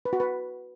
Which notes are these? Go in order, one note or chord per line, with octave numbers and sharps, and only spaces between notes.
B4
F#4
B4